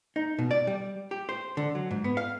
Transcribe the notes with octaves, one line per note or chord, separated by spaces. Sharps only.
D#4
B2
D5
G3
G4
C5
D3
F#3
G#2
B3
F5